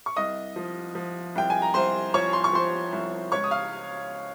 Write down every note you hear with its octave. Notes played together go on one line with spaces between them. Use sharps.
C#6
C2 D#5 D#6
F3
F3
C2 G5
G#5
A#5
C2 C5 C6
F3 C#5 C#6
C6
C#6
F3 C5 C6
C2
C#2 C#5 C#6
D#6
F5 F6